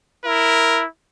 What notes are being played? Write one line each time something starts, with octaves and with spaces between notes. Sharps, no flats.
E4 A#4